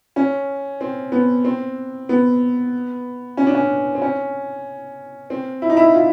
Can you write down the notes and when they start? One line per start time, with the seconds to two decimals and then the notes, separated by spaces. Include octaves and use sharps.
0.16 C#4
0.81 C4
1.12 B3
1.44 C4
2.09 B3
3.37 C#4
3.47 D4
3.55 C#4
3.95 C4
4.02 C#4
5.30 C4
5.62 E4
5.70 D#4
5.77 E4
5.94 F4